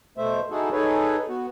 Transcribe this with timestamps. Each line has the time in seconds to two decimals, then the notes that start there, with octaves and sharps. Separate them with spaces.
0.17 B2 A3 C5 E5
0.51 D#4 E4 F#4 G#4 A4
0.72 D#4 G#4 A4 B4 C#5
1.28 B3 F#4